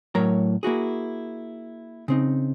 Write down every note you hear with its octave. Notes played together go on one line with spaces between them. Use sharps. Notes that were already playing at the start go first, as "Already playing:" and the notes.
A2 F#3 A#4 C#5 A#5
A#3 E4 F#4 G#4
C#3 C4 D#4